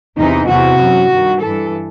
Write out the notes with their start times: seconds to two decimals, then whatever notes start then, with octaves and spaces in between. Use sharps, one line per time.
0.18 E2 C3 E3 D#4
0.50 E2 C3 E3 F#4
0.80 F#2 E3
1.11 G2 D#3
1.42 G2 E3 A4